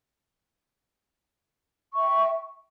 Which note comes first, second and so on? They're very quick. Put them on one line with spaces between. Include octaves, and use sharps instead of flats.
C#6 E5 G5